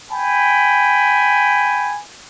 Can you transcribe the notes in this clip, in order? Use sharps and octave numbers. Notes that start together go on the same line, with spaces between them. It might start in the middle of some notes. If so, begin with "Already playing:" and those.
G5 G#5 B5